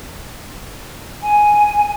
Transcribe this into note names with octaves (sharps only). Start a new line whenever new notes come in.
G#5